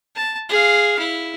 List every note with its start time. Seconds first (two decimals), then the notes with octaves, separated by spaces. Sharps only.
0.15 A5
0.49 G#4 F5
0.99 E4